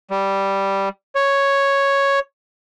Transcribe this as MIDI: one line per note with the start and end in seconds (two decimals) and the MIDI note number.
0.11 0.89 55
1.15 2.19 73